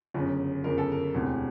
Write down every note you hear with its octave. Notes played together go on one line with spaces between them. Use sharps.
G1 F#2 C#3
G1 F#2 C#3 A#4
A4
A#4
E1 D2 C3